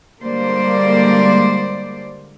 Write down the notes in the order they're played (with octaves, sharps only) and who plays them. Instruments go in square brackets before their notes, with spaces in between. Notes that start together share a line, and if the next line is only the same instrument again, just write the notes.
[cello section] D3 G3 G#3 A#3 C5 D5